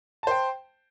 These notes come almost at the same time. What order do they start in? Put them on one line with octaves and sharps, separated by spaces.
A5 C5 G5